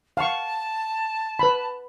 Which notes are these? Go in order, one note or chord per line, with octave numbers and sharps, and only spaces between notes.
F5 F#5 A5 C#6
B4 B5